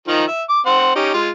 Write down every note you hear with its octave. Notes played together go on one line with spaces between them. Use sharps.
D#3 F3 D#4
E5
D6
C4 C5 F#5
C#4 D#4 G4
G#3 F4